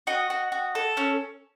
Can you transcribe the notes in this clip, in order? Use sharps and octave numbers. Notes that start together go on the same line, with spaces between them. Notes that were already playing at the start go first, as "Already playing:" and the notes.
F#4 D#5
F#4
F#4
A4
C#4